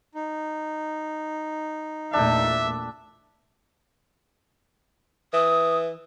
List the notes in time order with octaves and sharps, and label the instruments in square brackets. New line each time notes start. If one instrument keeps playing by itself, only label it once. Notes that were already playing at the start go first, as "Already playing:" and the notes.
[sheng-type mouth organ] D#4
[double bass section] E2 A#2 A3 [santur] D4 G5 [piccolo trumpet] E5
[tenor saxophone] E3 [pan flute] D#6